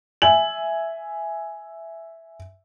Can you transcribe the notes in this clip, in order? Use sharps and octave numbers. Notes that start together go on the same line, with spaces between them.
E5 G#5 F#7